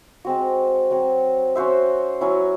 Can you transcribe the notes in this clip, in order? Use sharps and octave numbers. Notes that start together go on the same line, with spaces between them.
G#3 C4 F#4
F#3 C4 F#4 C#5
C#4 F#4 C5 E5
F#3 C#4 E4